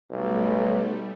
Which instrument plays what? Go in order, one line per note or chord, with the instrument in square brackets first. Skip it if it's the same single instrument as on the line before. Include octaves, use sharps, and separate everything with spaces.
[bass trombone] B1 [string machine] G3 A3